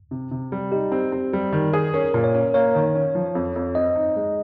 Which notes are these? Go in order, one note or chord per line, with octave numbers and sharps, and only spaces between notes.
C3
C3
G3
D#4 G4
C4
C4
G3
D#3
G#4
C#4 A#4
A#2
C#5
C#4
A#3 C#5
D#3
C#4
F3
F2
F2
C4 D#5
D#4
G#3